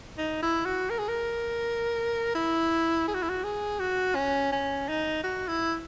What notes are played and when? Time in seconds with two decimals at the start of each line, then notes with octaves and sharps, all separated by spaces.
0.18 D#4
0.43 E4
0.66 F#4
0.90 A#4
0.99 G#4
1.08 A#4
2.35 E4
3.08 G#4
3.14 F#4
3.23 E4
3.29 F#4
3.43 G#4
3.80 F#4
4.15 C#4
4.52 C#4
4.89 D#4
5.23 F#4
5.48 E4